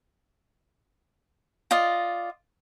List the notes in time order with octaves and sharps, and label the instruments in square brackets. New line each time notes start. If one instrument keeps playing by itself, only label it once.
[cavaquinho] F4 D5 D#5